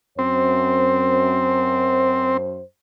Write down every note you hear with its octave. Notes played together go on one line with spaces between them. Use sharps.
F#2 C4 C5